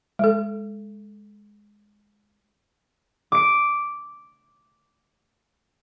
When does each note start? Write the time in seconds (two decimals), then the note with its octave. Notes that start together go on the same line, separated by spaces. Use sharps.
0.19 G#3 A4
3.32 D6 D7